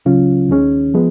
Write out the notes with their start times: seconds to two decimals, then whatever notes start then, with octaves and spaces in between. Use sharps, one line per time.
0.05 C#2 C#3 F#3 C#4 F4
0.49 D#2 D#3 G#3 C#4
0.94 F3 G#3 B3